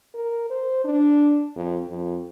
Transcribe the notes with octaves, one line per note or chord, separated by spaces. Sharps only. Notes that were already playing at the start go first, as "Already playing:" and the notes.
A#4
C5
D4
F2
F2